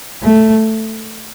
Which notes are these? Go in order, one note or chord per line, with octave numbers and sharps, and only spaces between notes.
A3